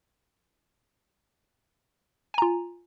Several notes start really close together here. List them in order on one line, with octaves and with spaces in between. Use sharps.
G#5 A#5 F4